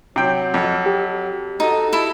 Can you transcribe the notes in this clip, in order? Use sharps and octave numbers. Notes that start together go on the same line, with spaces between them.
C3 F#3 G5
F2
G4
D#4 F#4 A4
E4 A4